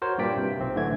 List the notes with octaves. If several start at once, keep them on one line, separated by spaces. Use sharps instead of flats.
F#4 A#4 C5 C#5
G2 A#2 D5 G5 B6
C3
B1 C4
A2 D3 E3 A3 G#6